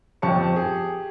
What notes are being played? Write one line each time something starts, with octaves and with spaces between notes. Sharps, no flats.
F2 C4 G4 A5 C#6 C#7
G4 G#4